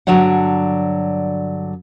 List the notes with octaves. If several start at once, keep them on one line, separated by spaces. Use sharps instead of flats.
G2 D3 F#3 D4 C#5 F#5